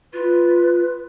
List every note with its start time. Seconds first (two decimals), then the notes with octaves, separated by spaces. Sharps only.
0.13 F4 B4